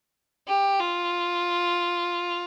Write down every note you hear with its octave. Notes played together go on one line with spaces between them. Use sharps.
G4
F4